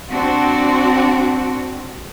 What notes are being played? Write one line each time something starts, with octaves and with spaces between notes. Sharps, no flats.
C4 D4 F#4